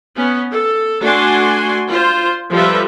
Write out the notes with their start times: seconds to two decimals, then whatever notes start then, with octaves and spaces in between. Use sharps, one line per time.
0.16 B3 C#4
0.51 A4
1.03 A3 D4 F#4 G#5 C6
1.89 F4 C5
2.51 F3 G3 F4 A4 B4 E5